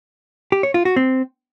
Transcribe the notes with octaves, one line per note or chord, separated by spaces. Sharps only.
G4
C#5
F4
F#4
C4